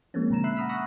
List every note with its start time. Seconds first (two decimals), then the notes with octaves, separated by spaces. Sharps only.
0.14 F3 G#3 A#3 C4 C#4
0.30 B2 D3 A#5 E7
0.44 E5 B5 E6 F#6 C7
0.57 F#5 A#5 B5 D#6 F6 B6
0.69 B5 C#6 D#6 E6 F#6 A#6